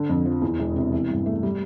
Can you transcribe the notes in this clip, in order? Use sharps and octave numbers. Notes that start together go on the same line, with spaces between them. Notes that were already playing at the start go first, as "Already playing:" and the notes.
Already playing: D3
F2
F3
E2
E1
C3
E3
G2
A3
G3